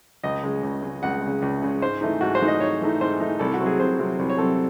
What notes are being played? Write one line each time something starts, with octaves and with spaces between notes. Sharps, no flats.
C#2 D#5
C#3 G#3
C#2
C#3 G#3
C#2 F#5
C#3 G#3
C#2
C#3 G#3
G#2 C5
E3 A3 D#4
G#2 F#4
C5
E3 A3 D#4
D#5
G#2 C#5
E3 A3 D#4
G#2 C5
E3 A3 D#4
C2 A4
F#4
C3 F#3 C4
G#4
C2 C5
C3 F#3 C4
C2
C#5
C3 F#3 C4 A4